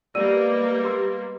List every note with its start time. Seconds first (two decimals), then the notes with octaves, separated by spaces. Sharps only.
0.15 G3 G#3 A#3 B3 D5 F#5 E6 D#7
0.84 G4 C6 E6